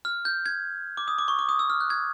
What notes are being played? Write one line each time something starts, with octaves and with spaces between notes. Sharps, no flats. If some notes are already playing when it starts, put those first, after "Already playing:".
F6
G6
G#6
D6
D#6
D6
C#6
D6
D#6
E6
F6
F#6
G#6